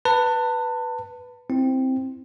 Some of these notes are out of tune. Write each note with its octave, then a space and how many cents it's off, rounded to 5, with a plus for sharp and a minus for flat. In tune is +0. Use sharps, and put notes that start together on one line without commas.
B4 +0 A5 +30
C4 +0 E4 +0